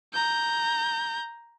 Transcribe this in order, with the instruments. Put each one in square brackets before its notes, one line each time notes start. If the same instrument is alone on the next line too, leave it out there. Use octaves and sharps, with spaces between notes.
[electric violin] A#5 G6